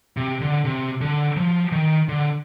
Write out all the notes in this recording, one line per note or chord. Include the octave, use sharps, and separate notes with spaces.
C3
D3
C3
D3
F3
D#3
D3